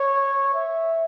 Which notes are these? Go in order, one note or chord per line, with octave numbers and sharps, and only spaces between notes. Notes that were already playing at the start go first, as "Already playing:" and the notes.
Already playing: C#5
E5